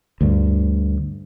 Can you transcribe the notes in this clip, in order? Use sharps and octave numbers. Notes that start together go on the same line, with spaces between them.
D2 G2